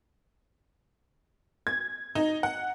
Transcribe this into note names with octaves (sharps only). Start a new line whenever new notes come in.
G#6
D#4
F#5